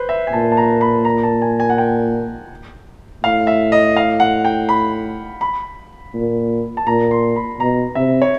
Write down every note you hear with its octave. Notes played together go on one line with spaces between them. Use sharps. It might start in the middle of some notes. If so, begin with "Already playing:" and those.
Already playing: B4 C5
E5
G#5
A#2 A5
A5
A#5
B5
A#5
A5
G#5
G#5
F#5
G5
A2 F5
E5
D#5
F5
F#5
G5
B5
B5
A#2
A5
A#2 A#5
C6
B5
B2 A#5
C3 E5
C#5